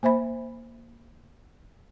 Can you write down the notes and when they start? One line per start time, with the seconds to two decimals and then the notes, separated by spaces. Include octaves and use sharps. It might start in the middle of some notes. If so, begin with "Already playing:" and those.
0.03 A#3 C5 E5 B5